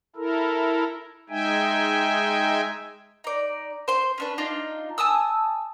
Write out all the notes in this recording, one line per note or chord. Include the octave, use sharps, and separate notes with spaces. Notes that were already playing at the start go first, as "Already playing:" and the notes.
E4 A4 A#4
G#3 D#4 E5 G5 G#5
D#4 D5
C5 C6
C#4 D4 B4
D4 D#4 F4
G#5 A5 D#6 E6